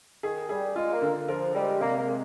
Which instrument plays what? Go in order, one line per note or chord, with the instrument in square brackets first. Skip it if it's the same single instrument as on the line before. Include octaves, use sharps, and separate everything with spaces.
[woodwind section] D#3 [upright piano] G#4
[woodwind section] G3 [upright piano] G#4
[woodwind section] G#3 [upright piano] F4
[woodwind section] A#3
[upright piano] D3
[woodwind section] F3 [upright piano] A#4
[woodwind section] G3 [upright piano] G#3
[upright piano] C3 [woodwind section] A#3
[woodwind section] A#3
[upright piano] G#3